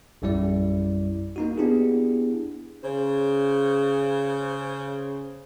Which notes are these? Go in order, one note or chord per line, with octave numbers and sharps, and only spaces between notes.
A#1 F#2 G3 E4 D5
A#3 D#4 F#4
B3 D4 E4 G4 G#4
C#3 C5